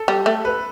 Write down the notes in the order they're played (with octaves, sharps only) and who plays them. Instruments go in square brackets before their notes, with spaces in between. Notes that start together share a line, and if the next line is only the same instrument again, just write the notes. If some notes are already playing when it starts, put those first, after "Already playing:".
Already playing: [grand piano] A4
[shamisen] G3
A3
[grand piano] B4